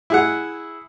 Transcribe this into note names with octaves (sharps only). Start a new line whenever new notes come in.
E4 G#4 F#5